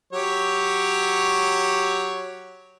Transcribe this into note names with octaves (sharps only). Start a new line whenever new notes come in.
F#3 G4 C#5